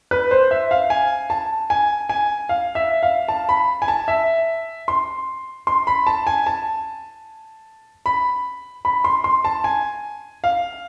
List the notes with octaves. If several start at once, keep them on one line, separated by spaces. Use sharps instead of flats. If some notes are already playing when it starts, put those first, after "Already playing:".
B4
C5
E5
F5
G#5
A5
G#5
G#5
F5
E5
F5
A5
B5
G#5
A5
E5
C6
C6
B5
A5
G#5
A5
B5
B5
C6
C6
A5
G#5
F5